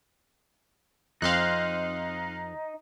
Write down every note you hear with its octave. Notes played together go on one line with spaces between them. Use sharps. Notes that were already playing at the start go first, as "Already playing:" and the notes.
F2 C4 D#4 F5 C6 F#6